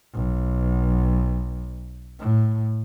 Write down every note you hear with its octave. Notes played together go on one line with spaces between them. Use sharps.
B1
A2